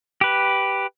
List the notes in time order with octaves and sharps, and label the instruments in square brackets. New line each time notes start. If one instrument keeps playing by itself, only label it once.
[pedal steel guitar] G4 B4